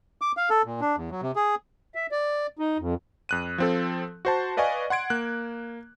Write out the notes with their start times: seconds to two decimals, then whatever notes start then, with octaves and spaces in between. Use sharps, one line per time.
0.22 D6
0.37 F5
0.50 A4
0.66 A#2
0.81 D4
0.96 E2
1.11 F#3
1.22 C3
1.36 G#4
1.95 E5
2.12 D5
2.59 D#4
2.78 F2
3.29 F2 F#6 D#7
3.58 F3 C4 A4
4.25 F#4 C5 A5
4.57 B4 D5 D#5 F5 G#5 C#6
4.90 F#5 C6 G#6 D7
5.10 A#3 F#6